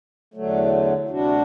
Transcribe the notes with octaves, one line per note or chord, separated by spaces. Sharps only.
E2 D3 F#3 A3
D2 C3 G3 D4 F#4